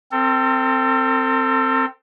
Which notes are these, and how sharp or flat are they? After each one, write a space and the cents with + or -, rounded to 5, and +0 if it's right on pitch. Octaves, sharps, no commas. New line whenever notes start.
C4 +0 A4 +40